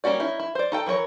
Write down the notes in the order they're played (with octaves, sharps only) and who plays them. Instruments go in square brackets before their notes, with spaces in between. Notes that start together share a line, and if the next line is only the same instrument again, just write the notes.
[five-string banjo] G3 A#3 C#4 F#4 D5
C#4 D#4 E4
E4
C5 D5
D#4 A4 G5
E3 F#3 A#4 C#5